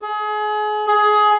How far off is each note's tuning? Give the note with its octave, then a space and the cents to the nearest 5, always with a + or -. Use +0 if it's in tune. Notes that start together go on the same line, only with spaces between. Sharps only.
G#4 +30
G#4 +15